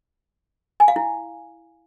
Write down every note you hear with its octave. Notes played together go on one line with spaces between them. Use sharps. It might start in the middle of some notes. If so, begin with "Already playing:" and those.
G#5
F5
E4